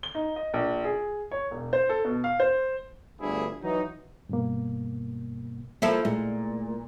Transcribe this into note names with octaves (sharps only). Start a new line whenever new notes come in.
G7
D#4
D#5
A#1
G#4
C#5
E1
C5
A4
B2
F5
C5
G1 D2 G2 E4 G#4
E3 F#3 D#4
G2 B2 A#3
F3 A#3 E4 A4 A#4
A#2 G#3 A3 E4